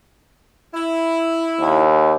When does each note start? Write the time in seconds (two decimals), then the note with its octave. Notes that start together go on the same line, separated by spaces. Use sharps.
0.74 E4
1.60 D#2